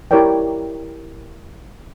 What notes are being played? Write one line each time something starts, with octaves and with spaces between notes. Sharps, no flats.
E4 G4 A#4 C#5 D5 G5